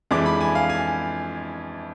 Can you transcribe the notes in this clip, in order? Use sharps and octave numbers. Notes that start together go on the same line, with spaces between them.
F2 E3 G#3 D4 D6
B5
G#5
F5
G#5